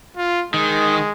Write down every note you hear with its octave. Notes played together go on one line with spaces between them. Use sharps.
F4
D#3 G#3